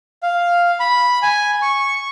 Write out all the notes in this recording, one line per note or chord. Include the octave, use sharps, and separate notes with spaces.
F5
B5
G#5
C#6